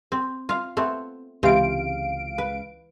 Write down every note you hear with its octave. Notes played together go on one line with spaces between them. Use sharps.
C4
F4 F5
A3 B3 C4
C#2 C3 E3 C4 F5 D7
B4